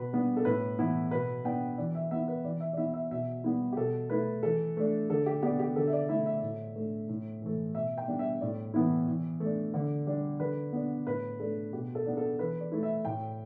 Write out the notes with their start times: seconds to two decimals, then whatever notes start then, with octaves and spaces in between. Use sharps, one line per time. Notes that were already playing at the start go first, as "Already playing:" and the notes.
Already playing: B2 B4
0.13 G3 B3 D4
0.37 A4
0.45 A2 B4
0.79 E3 B3 E4
1.11 B2 B4
1.45 B3 D4 G5
1.78 E3 D5
1.95 E5
2.11 B3 E4 E5
2.28 B4
2.44 E3 D5
2.60 E5
2.73 D5
2.77 B3 E4 E5
2.94 E5
3.11 B2 E5
3.44 G3 B3 E4
3.72 G4
3.76 B2 A4
4.10 A3 E4 B4
4.43 E3 A4
4.77 A3 D4
5.09 D3 A4
5.26 G4
5.43 B3 D4 G4
5.59 G4
5.76 D3 A4
5.88 E5
5.93 D5
6.09 A3 E4 E5
6.26 E5
6.42 A2
6.76 A3 D4
7.09 A2
7.42 E3 A3
7.75 B2 E5
7.98 G5
8.07 G3 B3 D4
8.19 E5
8.41 A2 D5
8.74 E3 B3 E4
9.08 E3
9.40 A3 D4
9.74 D3
10.07 G3 D4
10.40 D3 B4
10.73 B3 D4
11.06 A2 B4
11.40 A3 D4 A4
11.73 B2 G4
11.95 A4
12.06 B3 D4
12.17 A4
12.39 E3 B4
12.61 D5
12.72 A3 E4
12.83 E5
13.05 A2 G5